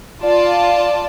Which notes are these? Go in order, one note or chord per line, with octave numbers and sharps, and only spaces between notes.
F4 D5 A5